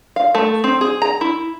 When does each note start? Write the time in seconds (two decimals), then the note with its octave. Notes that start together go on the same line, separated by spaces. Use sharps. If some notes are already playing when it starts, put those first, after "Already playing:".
0.16 F5
0.35 A3
0.64 C4
0.81 G#4
1.02 A#5
1.21 E4